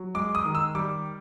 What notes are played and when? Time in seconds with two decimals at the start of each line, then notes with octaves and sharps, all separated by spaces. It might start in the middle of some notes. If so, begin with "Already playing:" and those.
Already playing: F#3
0.14 G#3 D6
0.35 D#6
0.45 D#3
0.55 E6
0.75 G3 D6